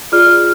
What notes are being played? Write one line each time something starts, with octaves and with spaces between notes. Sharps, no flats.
F4 G#4 D5 F6